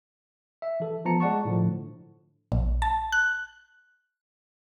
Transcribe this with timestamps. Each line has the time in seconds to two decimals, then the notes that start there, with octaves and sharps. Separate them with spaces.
0.62 E5
0.80 E3 A4
1.05 F3 B3 A5 A#5 C#7
1.20 G#3 D5 F#5 A5 C#6
1.45 A2 D3 F3
2.52 A#1
2.82 A5
3.12 F#6